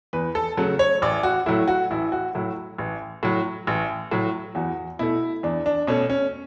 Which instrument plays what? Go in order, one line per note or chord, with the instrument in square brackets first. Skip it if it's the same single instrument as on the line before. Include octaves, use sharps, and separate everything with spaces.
[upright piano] E2 B4
A4
C#3 F#3 A3
C#5
A1 D5
F#4
A2 F#3 A3 E4
F#4
A1 E4
F#4
A2 F#3 A3 E4
A1
A2 F#3
A1
A2 F#3
E2 F#4
B2 A3 E4
E2 D4
D4
B2 A3 C#4
C#4